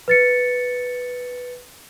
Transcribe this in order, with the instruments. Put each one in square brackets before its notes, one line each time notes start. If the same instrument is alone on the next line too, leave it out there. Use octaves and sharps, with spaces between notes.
[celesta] B4 A6 C#7